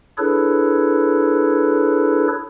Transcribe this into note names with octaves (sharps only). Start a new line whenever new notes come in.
D4 E4 G#4 A4 B4 C#5